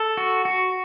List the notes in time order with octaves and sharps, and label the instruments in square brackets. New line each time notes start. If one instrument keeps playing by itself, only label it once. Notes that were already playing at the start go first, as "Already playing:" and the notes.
Already playing: [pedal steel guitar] A4
F#4
F#4